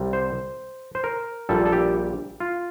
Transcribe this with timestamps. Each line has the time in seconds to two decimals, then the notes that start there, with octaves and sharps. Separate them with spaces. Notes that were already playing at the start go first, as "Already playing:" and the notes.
Already playing: C2 C3 G3
0.13 C5
0.95 C5
1.04 A#4
1.49 A#1 A#2 G3 A4
1.65 A4
1.72 G4
2.40 F4